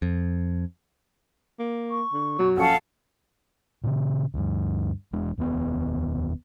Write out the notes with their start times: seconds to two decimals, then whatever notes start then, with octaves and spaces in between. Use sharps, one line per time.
0.02 F2
1.59 A#3
1.90 C#6
2.13 D3
2.39 F#2 B2 F#3
2.57 A#1 C#4 A4 F5 F#5 C#6
3.84 A#2 C#3
4.34 D2 G2
5.13 E1 G#3 D4
5.38 F1 D#2 C3 B3